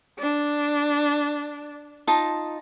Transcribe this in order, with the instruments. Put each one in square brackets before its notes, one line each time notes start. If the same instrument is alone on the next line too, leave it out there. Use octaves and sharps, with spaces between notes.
[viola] D4
[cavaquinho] D#4 F4 A5